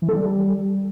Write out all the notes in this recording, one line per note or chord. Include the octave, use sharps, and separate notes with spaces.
E3
A4
G3